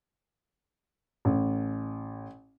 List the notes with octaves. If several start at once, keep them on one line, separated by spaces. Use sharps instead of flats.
A1